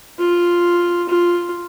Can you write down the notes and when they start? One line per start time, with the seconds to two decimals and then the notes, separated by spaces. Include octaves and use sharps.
0.19 F4
1.09 F4